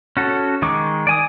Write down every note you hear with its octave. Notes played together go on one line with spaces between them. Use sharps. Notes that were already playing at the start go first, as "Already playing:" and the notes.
C#4 F#4 A4
D#3 G#3 C#6 D6
D5 G#5 D#6